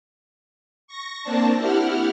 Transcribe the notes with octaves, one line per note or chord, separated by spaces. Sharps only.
C#6 A#6
A#3 C4 D4 A5
E4 G4 F#5 F6